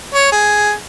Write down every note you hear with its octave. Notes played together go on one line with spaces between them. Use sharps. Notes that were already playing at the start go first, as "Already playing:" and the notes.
C#5
G#4